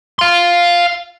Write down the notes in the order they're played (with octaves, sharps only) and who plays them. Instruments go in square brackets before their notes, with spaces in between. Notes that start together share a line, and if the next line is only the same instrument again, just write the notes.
[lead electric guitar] F5 C6